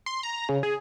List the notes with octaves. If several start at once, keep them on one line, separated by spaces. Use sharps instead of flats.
C6
A#5
C#3
G#4